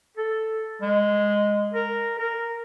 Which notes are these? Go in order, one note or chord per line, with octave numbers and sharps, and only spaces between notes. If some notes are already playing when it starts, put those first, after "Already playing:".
A4
G#3
A#4
A#4